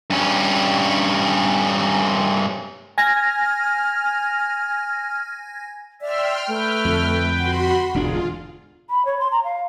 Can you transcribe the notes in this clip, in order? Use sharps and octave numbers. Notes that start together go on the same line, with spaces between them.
G2 C#4
G#5 F6 G#6 A#6
D5 E5 G5 C6 F6
A3 B4 G5 F6
F2 D3
F#4 F#5 B5 C6
E1 D2 G#2 D3 D4 F4 G#4
B5
C#5
C6
A#5
F5